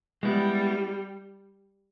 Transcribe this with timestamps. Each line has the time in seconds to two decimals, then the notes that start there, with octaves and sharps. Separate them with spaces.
0.23 G3 G#3 B3 E4